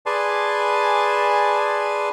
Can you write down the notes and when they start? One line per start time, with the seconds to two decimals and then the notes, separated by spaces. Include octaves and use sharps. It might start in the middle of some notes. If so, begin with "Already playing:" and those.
0.06 G#4 B4 D5 G#5 A5 C6